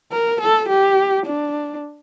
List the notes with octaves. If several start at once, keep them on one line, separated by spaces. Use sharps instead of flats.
A#4
A4
G4
D4